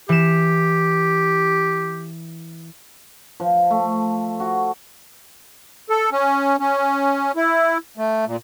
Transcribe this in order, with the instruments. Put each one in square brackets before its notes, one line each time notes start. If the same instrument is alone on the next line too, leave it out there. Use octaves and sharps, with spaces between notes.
[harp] E3 E7 [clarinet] G4
[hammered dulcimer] F3
A3
F#4
[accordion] A4
C#4
C#4
E4
A3
A#2